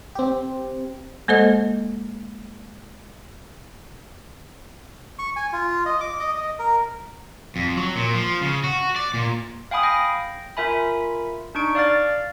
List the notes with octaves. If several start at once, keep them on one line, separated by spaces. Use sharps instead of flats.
C4 G4
G#3 A#3 A4 C5 D#5
C#6
G#5
F4
D#5
D6
D#5
D#5
A#4
F2
F#3
A#2
F3
C#3
F#4
D5
A#2
F5 G5 G#5 B5 D#6
G5 A#6
F4 A#4 E5 G#5 B5
D4 D#4 C#6 D7
D5 F5 F6 A6